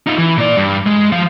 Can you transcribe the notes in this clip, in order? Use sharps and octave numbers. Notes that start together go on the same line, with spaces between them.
D#4 F4
E3
A#2 D5
G2
G#3
F3 F5